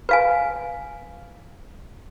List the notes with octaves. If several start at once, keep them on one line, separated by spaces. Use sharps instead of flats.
B4 F5 G#5